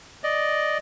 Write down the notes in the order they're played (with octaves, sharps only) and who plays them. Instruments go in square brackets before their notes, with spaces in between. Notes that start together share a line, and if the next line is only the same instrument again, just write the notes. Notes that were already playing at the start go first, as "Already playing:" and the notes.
[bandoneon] D5 D#5